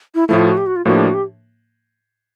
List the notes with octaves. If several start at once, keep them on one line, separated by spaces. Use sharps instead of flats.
E4
A2 F3 A3 E4
F4
F#4
G4
F#4
F4
A2 F3 A#3 D4 F#4
G4
F#4
G4